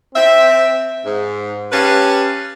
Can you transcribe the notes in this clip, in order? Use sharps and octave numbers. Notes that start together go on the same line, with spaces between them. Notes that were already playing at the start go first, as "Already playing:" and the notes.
C4 E5
G#2
C#4 G4 B4 F5 A5